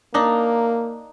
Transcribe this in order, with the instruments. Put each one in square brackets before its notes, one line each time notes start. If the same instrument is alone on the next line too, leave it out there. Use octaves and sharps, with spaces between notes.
[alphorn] A#3 [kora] D4 D#4